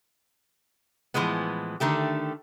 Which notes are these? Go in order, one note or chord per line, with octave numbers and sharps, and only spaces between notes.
A2 E3 F3 G#3 B3
D3 D#3 A3 G4